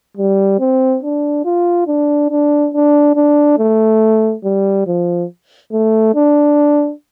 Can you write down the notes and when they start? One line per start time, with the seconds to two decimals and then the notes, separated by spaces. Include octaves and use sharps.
0.17 G3
0.60 C4
1.03 D4
1.45 F4
1.87 D4
2.30 D4
2.74 D4
3.16 D4
3.58 A3
4.44 G3
4.87 F3
5.72 A3
6.15 D4